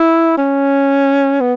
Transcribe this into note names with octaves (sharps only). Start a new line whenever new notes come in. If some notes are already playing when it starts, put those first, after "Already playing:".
Already playing: E4
C#4
B3